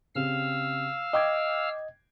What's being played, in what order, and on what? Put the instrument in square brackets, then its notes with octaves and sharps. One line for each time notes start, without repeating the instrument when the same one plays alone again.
[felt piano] C#3 C4 G4 [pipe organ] F5 E6 F6
[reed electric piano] D#5 [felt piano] G5 D6 G#6